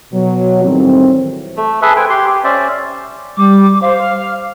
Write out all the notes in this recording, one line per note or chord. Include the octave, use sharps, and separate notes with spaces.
B2 F#3
A2 D#3 E3 G3 C4
A3
G#4 A4 B4 E5
B4 C5 G5 G#5
G4 C6
G4
C#4 C5 D5 E5
G3 D6
C5 F5
F6